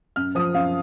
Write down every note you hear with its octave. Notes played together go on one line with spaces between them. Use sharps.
F#2 F6
F3 D#6
F#2 F5